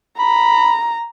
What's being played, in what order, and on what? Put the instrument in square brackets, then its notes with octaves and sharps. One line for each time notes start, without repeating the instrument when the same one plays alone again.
[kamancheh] A#5 [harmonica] B5